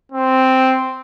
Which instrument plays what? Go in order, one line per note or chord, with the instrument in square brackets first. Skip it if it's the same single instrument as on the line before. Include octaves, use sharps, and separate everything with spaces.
[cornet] C4